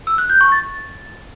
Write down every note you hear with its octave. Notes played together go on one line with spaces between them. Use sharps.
E6
F#6
G6
C#6
A6